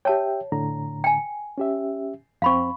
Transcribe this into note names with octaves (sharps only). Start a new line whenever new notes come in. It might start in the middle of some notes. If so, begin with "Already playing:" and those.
G4 C#5 E5 G5 A5
A2 D3 A#5
G5 G#5
C#4 G4 E5
F2 C4 F5 B5 C#6